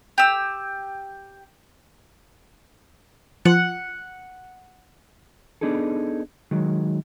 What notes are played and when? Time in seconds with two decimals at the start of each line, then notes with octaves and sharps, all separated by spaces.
0.18 G4 E6
3.45 F3 F#5
5.61 B3 D4 D#4 G#4 A4
6.51 D#3 F#3 G#3